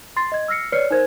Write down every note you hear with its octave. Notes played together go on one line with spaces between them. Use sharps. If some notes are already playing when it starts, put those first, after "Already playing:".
C6 A6 C7
D#5 G#6
E6 F6 A#6 C7 C#7
B4 C#5 D5 F6 C7 C#7
D#4 A#4 C5 G#6